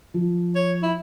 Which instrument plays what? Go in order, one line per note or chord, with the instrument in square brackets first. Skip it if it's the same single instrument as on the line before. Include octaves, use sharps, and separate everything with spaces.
[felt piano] F3
[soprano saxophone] C#5
E4